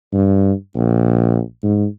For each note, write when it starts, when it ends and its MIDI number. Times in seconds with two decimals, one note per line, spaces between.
0.14 0.52 43
0.76 1.40 34
1.63 1.86 44